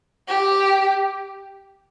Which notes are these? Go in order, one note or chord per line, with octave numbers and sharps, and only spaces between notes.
G4